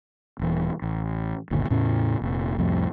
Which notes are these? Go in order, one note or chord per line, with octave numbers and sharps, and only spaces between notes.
D#1 E3
A1
G1 D2 A#2 D#3
E2 A2 C#3 C#4
F1 A#2
C2 F2 A2